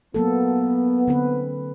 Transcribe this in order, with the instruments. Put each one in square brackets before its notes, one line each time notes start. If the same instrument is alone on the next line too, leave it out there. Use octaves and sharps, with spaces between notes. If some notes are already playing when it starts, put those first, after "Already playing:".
[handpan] F#3 A#3 A4 [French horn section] B3
[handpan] D3 C4 B4